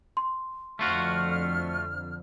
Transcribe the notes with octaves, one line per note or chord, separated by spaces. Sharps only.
C6
F2 D3 A3 F4 F#4 F6